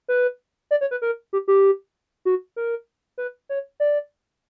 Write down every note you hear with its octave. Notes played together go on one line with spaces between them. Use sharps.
B4
D5
C#5
B4
A#4
G4
G4
F#4
A#4
B4
C#5
D5